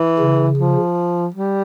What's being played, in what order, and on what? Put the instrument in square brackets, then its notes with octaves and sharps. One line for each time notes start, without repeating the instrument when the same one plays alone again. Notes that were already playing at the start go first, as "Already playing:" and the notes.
Already playing: [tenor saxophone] E3
[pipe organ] C#3
[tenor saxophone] F3
G3